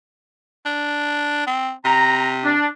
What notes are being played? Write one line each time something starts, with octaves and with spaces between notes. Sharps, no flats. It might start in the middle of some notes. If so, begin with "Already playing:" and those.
D4
C4
C3 A#5
D4